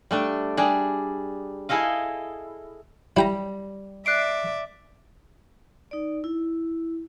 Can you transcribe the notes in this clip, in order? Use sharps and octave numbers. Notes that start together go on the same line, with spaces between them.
G3 A3 D4
G3 D4 G#4
E4 G#4 A4 D#5 F5
G3 E4 G5 A#5
D5 E5 F#6 C7 D7
D#4 D5
E4